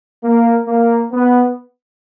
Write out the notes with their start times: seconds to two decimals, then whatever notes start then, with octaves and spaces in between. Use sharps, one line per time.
0.23 A#3
0.67 A#3
1.12 B3